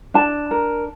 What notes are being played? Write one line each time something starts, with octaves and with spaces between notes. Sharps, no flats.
D4 A5
A#4